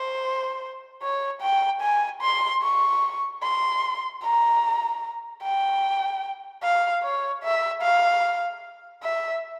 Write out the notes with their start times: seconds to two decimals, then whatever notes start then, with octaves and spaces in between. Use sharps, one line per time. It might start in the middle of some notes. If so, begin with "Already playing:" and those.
Already playing: C5
1.02 C#5
1.42 G5
1.82 G#5
2.22 C6
2.62 C#6
3.43 C6
4.23 A#5
5.42 G5
6.63 F5
7.03 C#5
7.44 E5
7.83 F5
9.03 E5